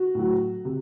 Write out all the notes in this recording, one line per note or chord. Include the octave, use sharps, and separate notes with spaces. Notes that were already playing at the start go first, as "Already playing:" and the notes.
Already playing: F#4
A2 F#3
C3